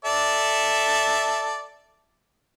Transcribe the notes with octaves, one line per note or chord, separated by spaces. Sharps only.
A4 D5 E5